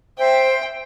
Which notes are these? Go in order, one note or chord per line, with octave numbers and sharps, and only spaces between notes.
C5 E5 G5